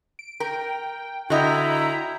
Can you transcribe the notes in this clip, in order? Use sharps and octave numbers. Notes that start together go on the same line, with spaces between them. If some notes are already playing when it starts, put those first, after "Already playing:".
D7
A#4 G5
D3 E4 F#4 D#5 G5 A#5 G6